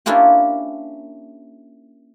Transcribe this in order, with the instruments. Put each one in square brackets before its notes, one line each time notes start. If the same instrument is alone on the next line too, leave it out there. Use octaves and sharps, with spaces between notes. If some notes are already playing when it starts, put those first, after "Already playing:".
[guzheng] A#3 C#4 D4 E4 F4 G4